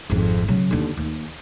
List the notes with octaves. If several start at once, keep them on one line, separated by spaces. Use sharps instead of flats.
G#1 F2
C#3 F#3
D#2 D3
D#2